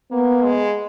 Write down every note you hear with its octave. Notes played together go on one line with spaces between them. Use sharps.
A#3 B3
G#3